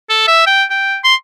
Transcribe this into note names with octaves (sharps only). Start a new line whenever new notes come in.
A4
E5
G5
G5
C6